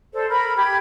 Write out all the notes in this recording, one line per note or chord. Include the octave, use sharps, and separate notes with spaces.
A4 C5 D5
A#4 B5
G4 G5 B5 G#6